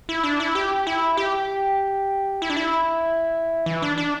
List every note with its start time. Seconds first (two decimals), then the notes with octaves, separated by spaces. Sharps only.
0.09 E4
0.23 D4
0.40 E4
0.55 G4
0.87 E4
1.17 G4
2.42 E4
2.50 D4
2.57 E4
3.66 E3
3.82 D4
3.98 D4